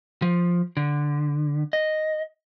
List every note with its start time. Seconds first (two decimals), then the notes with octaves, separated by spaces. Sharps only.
0.22 F3
0.77 D3
1.73 D#5